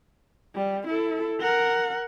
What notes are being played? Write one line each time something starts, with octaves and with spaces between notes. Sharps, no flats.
G3
E4 A4
A#4 F#5